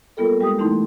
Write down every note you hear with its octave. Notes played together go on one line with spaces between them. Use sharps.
G3 A#3 B3 F4 A4 A#4
G3 G#3 G4 D#6
E3 A3 D#4 E4 C6